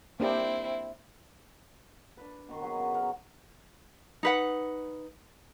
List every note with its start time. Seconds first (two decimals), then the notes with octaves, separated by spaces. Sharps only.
0.20 A#3 C4 D4 E4 G4
2.17 D4 B4
2.49 B2 D#3 C6
2.62 F#3 F#4 G#4 B4
2.79 C#3
2.94 B3 A#4 F#5
4.23 D#4 B4 F#5